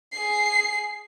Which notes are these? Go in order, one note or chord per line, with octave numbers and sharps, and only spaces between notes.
G#4 C7